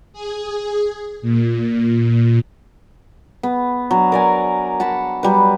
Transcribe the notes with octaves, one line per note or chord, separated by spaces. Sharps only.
G#4
A#2
B3
F#3 D4
A#4 D5 G#5
F#5 A5 B5
F#3 G3 B4